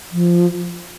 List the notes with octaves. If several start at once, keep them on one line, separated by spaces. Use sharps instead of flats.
F3